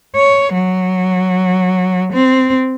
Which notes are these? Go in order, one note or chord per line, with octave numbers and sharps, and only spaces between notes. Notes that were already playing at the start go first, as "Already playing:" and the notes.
C#5
F#3
C4